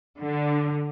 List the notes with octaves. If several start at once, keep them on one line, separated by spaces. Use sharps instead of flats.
D3